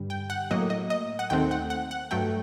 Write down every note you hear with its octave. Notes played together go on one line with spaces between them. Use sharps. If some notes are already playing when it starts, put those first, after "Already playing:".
Already playing: G2 D3 G3
G5
F#5
A2 F#3 A#3 D#5
D#5
D#5
F#5
D#2 D#3 A3 C4 G5
F#5
F#5
F#5
G2 F#3 A3 G5